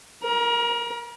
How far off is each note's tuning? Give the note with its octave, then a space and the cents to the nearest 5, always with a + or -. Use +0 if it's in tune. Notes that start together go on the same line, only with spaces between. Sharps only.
A#4 +10 A#5 +40